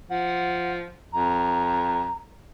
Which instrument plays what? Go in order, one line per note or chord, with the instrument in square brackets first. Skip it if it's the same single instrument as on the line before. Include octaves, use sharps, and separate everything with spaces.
[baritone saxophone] F3 [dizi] F#5
[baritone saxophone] F2 [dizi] A#5